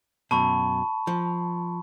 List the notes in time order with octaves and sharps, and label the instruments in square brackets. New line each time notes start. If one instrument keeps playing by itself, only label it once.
[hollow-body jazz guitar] F#2 B2 [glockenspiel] A5 B5 C#6
[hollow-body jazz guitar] F3